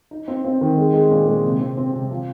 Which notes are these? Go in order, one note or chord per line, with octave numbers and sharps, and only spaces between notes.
D#4
C4
C4
D#3
G#3
G#3
A#2
G#3
C3
C4
C4
C3
F3